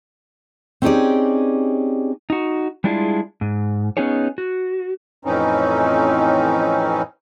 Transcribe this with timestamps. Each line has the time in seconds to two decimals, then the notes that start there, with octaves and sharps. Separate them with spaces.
0.82 C4 C#4 D#4 G4 G#4 D5
2.30 D#4 F#4
2.84 G3 G#3 D4 E4 F4 G#4
3.41 G#2
3.97 B3 C#4 D#4 G#4 C#5
4.38 F#4
5.25 F2 A2 E3 C4 C#4 D#4